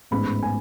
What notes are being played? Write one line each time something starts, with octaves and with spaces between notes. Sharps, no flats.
A1 G#2 G#3 B3 B5
G#5